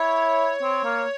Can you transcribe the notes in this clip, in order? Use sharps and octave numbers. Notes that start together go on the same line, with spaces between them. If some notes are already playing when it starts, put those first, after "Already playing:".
Already playing: E4 C#5
C4
A#3